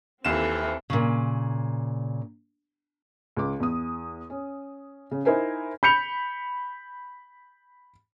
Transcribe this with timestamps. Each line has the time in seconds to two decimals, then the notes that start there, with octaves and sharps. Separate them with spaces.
0.25 D#2 E3 C4 A4 E7
0.90 A#2 C#3
3.37 C#2 D6
3.60 E2 D#6
4.30 C#4
5.11 C#3
5.25 D#4 E4 A#4 C5 G#5
5.83 B5 G6 C#7 F7